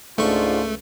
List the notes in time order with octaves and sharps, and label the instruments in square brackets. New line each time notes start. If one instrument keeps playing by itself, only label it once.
[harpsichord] C#2 C#6 [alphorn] G#2 [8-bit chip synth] A3 [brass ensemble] D4 F4